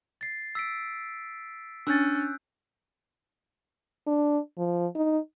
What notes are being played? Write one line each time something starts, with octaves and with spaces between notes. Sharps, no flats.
A6 C7
E6 B6 D7
C#4 D4 E6 F#6 G6 A6
D4
F3
D#4